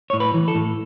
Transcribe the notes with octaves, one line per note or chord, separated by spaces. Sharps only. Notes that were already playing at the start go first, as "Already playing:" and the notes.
A2 C#5
B4
E3
A4
A2